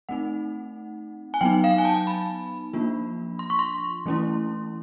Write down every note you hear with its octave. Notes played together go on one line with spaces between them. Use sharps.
A3 C4 D#4 F#5
G#5
F#3 B3 D#4 G5
F5
G#5
A5
B5
F3 A#3 D4 F4
C6
C#6
C6
E3 A3 C#4 E4